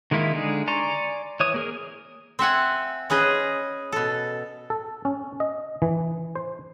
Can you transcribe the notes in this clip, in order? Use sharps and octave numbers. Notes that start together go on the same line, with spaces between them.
D#3 G#3 A#3 E4 F4
D3 G#3 D#4 G#4
D5 G#5 A#5 C6 C#6
E3 C#5 D#6
A#3 G#4 A#4
C4 E5 F#5 G#5
C#4 G#4 B4 D#5
B2 A4
A4
C#4
D#5
E3
C5